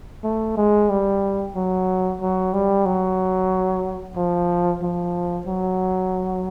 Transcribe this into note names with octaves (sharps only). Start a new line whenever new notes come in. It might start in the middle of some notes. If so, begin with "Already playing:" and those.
A3
G#3
G3
F#3
F#3
G3
F#3
F3
F3
F#3